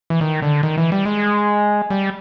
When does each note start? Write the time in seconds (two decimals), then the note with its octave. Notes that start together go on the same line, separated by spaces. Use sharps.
0.10 E3
0.21 D#3
0.42 D3
0.63 D#3
0.78 E3
0.92 G3
1.05 G#3
1.90 G3